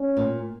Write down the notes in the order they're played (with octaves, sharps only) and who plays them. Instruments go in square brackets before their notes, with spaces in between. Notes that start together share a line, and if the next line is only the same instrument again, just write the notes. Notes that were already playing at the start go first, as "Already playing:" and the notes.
Already playing: [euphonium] C#4
[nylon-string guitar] A#2